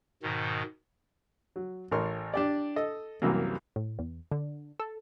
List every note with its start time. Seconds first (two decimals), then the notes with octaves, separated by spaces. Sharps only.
0.23 G#2 B2 D#3
1.56 F#3
1.91 A1 A2 A#4 C6 C#6
2.34 D4 G4 D5
2.76 A4 D#5
3.22 C2 F#2 C3 E3 F#3 A#3
3.76 A2
3.99 E2
4.31 D3
4.79 A4